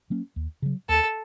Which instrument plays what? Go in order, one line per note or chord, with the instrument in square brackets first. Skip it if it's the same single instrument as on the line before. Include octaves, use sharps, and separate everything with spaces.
[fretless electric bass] F#3 A#3 C#4
D#2
C#3 F#3
[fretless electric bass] D#2 [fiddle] A4